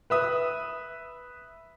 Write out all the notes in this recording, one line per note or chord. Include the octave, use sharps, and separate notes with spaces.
B4 E5 D#6